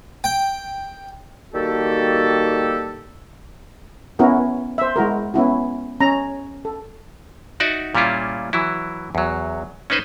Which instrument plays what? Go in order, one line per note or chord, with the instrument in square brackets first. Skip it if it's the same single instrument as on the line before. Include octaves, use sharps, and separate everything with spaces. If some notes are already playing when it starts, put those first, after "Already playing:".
[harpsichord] G5
[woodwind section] D#3 G3 A#3 F#4 G4 A4
[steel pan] B3 C#4 E4 F#4 A#4
C5 E5
G#3 E4 F#4 A#4
B3 C#4 E4 F#4
C#4 A#5
A4
[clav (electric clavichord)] D#4 F#4 D5 E5 F#5
A#2 G3 C#4 E4 F4
E3 F#3 E4
E2 F#3
C#4 D#4 B4 C5 D#5